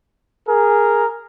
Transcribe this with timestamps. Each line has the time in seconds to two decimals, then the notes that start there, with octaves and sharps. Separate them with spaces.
0.47 G#4 A#4